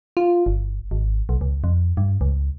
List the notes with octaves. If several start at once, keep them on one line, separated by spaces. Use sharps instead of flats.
F4
G1
G#1
B1
C#2
F2
G2
C#2